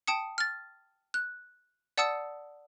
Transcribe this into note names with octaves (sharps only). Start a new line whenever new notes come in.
G5 A5 D#6 C#7
F6 A6
F#6
D5 F#5 A5 D#6 E6 C#7